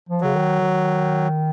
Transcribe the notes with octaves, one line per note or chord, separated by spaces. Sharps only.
F3
C#3 F#3
D#3
D#3